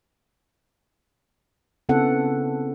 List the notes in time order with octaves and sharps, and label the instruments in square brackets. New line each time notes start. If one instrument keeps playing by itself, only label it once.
[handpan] C#3 B3 C4 E4 A4 F#5